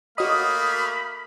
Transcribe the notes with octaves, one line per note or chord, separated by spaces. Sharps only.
A3 A#3 F#4 C#5 D#5 F5 B5 D#6